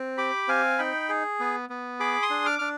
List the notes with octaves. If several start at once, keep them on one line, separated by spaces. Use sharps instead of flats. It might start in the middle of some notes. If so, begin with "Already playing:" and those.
Already playing: C4
G4 B5 D6
C4 F5 G#5
D#4 G5 B5
G#4
B3
B3
G#4 B5 D6
C6 D#6
D4
D6 F6
D4 F6